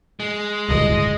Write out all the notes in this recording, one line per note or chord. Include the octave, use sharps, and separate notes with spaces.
G#3
D1 C#2 G2 D#5